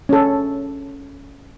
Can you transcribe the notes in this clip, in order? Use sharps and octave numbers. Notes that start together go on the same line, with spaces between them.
C#4 A4